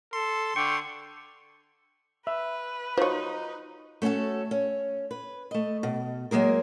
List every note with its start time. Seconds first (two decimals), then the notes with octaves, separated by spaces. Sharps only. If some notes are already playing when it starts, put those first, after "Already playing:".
0.13 A4 C6
0.56 D3 G5 C#6
2.27 B4 E5
2.97 D#4 F4 F#4 C5 C#5
4.02 A3 C#4 D#4 F#4 A4
4.51 C#4
5.11 B4
5.51 A3 D#5
5.83 B2
6.31 F#3 G#3 A#3 G#4 A#4